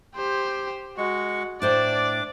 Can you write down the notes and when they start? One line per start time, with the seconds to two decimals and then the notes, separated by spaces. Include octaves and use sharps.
0.16 G4 C5
0.98 G#3 F#4 C#6
1.62 A2 D4 C5 D5 A5 D6